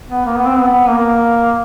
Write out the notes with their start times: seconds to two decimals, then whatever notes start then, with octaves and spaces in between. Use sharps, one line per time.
0.10 B3
0.26 A#3
0.37 B3
0.46 C4
0.58 B3
0.89 A#3